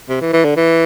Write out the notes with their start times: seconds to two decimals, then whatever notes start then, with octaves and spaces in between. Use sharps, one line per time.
0.09 C3
0.21 E3
0.33 E3
0.45 D3
0.57 E3